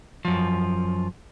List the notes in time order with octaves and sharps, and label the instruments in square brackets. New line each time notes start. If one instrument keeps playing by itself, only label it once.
[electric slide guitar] F#2 F3